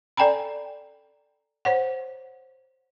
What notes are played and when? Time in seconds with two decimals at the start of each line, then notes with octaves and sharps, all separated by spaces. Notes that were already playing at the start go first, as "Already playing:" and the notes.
0.17 A4 D5 G5 G#5 A#5 B5
1.65 C5 C#5 F#5